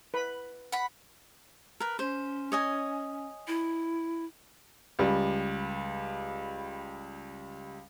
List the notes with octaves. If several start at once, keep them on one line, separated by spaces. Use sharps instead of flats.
B4 B5
F#5 B5
A#4 B4
C#4 C5
C#5 D#5 G#5
E4
C#2 G3